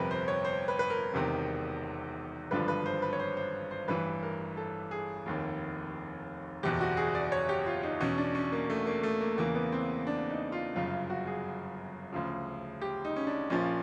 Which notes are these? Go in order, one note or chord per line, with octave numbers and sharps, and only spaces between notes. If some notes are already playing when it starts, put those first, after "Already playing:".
Already playing: G1 F2 C3 A#4 B4
C5
C#5
C5
B4
B4
A#4
E1 E2 C3 D#3
G#1 G2 D3 F3 B4
B4
C5
B4
C#5
C5
C5
C5
A1 G2 E3 B4
A#4
A4
G#4
F1 D#2 D#3
F#1 E2 B2 G4
F#4
G#4
D5
C#5
G4
F4
D#4
E2 B2 C#4
D4
C#4
A#3
A3
A#3
A3
A#3
E2 C#3 E3 A#3
B3
C4
D4
D#4
F4
G1 F#2 C#3 F4
F#4
G#4
D2 C#3 F3
G4
D#4
C#4
D4
A#1 A#2 F3 C#4